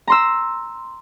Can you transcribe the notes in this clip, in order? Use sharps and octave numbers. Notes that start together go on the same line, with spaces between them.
A#5 C6 E6